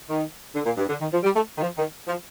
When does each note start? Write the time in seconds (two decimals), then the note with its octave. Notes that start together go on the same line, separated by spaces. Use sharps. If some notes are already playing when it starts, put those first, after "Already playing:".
0.08 D#3
0.55 D3
0.66 A#2
0.77 G2
0.89 D3
1.00 D#3
1.12 F3
1.23 G3
1.35 A3
1.57 D#3
1.61 F3
1.78 D#3
2.08 F3